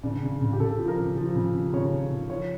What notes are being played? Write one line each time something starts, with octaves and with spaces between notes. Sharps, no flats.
C#3 D4
C#3
C#3
G4
C#3 A4
F3
A#4
C#3
F3
C#3
C#3
C#3 C#5
C#3
C#3
F3 C#5